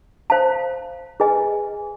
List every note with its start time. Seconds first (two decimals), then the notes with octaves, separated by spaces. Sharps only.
0.30 C5 F5 A5
1.20 G#4 B4 D#5 G#5